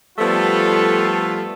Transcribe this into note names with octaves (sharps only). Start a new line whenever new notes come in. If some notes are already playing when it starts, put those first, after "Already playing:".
F3 G3 A3 B3 F4 A4